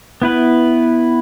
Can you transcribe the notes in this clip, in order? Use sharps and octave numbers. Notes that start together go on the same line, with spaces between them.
B3 E4 B4